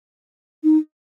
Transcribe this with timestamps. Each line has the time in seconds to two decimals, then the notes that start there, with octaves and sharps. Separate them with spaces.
0.64 D#4